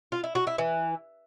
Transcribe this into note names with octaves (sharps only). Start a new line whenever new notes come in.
F4
E4
F#4
E4
E3